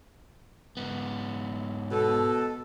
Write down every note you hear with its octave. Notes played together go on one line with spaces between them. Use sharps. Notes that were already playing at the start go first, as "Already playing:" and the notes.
G#2 B3
B2 A4